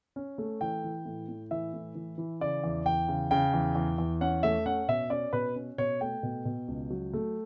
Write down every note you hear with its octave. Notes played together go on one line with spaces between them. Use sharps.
C#4
A3
E3 G5
E3
A2
A2
E3 E5
A2
E3
E3
C#3 D5
E2
E2 G5
C#3
C#3 G5
E2
E2
E2
C#4 F#5
A3 E5
C#4 F#5
B2 E5
C#4 D5
B2 B4
C#4
B2 C#5
A3 G5
B2
B2
C#2
F#3
A3